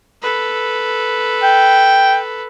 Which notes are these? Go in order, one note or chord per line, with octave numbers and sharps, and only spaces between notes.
A4 B4
G5